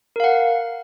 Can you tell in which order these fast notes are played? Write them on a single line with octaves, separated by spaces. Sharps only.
A#4 F5 F#5